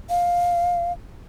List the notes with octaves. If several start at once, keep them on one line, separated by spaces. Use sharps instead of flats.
F5